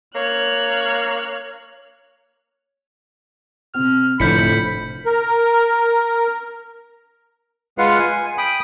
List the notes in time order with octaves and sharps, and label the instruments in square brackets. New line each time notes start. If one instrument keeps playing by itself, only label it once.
[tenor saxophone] A#3 [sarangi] C#5 [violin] F6 F#6
[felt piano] C3 C4 [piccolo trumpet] F6
[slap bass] F1 F3 [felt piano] A2 D3 [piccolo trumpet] B5 [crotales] G6 B6 C#7
[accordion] A#4
[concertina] G#3 F4 B4 F5 F#5
G#5
G5 B5 D#6